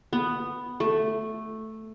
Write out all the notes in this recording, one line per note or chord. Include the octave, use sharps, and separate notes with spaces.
B3
A3